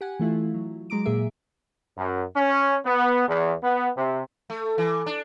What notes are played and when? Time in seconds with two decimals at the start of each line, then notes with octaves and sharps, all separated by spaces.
0.01 G4 F#5 G#5
0.19 E3 A3 E4 F4
0.54 F#3
0.90 F#3 G#3 A#5 D6 D7
1.05 A#2 A#3 G#4 E5
1.97 F#2
2.35 C#4
2.84 B3
3.27 E2
3.62 B3
3.96 C3
4.50 A3
4.78 E3
5.06 D4